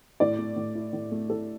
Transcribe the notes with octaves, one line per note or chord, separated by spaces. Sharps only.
A2 D5
A3
A2
E4
A2
A3
A2 A4